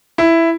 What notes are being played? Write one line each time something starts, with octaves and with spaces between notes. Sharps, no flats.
E4